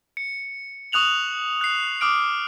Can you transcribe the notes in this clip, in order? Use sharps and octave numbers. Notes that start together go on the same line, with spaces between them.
C#7
C#6 D#6 F#6 F7 F#7
F#6 C7
D6 D#6 F6 D7